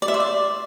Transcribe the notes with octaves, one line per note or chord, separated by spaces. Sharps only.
D5
E5
C5
D5